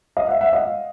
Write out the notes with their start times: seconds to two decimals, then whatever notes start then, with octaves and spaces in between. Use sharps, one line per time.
0.17 D#5 F5
0.28 E5 F#5
0.41 E5 F#5
0.53 D#5 F5